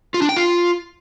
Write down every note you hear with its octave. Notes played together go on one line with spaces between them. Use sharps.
F4
D4
G5
F4